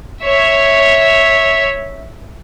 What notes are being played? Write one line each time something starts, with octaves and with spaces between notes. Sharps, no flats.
C#5 E5